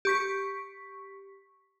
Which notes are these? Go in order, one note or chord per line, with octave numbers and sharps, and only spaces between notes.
G4 C#6 B6